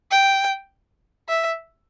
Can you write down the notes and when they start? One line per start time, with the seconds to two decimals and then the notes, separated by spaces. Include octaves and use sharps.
0.11 G5
1.29 E5